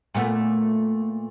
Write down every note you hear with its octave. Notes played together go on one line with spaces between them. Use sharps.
A#2 A3 B3